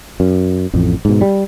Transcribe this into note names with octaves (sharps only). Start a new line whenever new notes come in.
F#2
A1 F2 A2
G#2 B2
G3